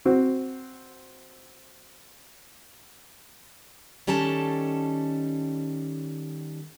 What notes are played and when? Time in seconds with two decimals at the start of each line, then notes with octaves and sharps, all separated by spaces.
0.05 C4 F#4
4.07 D#3 G3 C#4 A4 A5